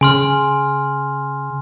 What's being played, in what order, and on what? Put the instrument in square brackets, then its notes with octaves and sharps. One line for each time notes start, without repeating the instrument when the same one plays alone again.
[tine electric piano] C#3 [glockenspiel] G#5 C6 F6